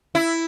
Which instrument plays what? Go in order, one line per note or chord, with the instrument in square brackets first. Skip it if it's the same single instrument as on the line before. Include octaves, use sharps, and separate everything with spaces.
[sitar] E4